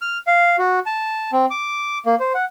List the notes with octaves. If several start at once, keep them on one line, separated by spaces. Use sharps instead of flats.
F6
F5
F#4
A5
C4
D6
A#3
C5
F#5